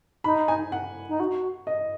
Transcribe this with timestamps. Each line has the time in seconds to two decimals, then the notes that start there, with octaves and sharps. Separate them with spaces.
0.24 D#4 B5
0.48 G#5
0.72 F#5
1.09 D#4
1.20 F#4
1.67 D#5